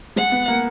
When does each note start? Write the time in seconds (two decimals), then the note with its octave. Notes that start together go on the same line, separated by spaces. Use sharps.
0.16 G#3 F#5
0.32 B3
0.48 A#3